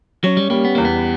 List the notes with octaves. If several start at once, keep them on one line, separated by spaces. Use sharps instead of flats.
F#3 C#4
G3
G3 A#3
B3
E2 A#3
B3